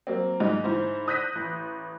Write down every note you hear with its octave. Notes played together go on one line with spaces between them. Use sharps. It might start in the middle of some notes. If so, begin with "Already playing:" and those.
F#3 A#3 C4
G#2 F#3 G#3 D#5
G#2 E4 C5
D#6 F#6 G6 A#6 B6 D#7
A1